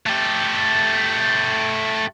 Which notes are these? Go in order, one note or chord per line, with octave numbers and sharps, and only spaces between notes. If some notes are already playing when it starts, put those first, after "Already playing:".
A3 G4